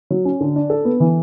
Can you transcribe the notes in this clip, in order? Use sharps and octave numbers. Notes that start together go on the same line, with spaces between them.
F#3
C#4
D3
D4
A4
B3
E3